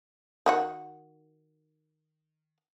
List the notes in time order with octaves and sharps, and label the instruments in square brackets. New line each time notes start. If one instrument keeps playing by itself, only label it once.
[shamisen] D#3 F#4 F#5